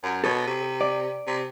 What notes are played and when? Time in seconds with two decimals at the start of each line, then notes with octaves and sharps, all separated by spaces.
0.03 F#2
0.24 B2 A4 C#5
0.47 C3
0.81 D5
1.27 C3